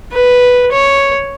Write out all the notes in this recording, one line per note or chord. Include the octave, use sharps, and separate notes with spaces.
B4
C#5